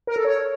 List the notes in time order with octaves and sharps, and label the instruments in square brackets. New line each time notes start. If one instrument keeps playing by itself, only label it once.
[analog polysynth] A#4
A4
C#5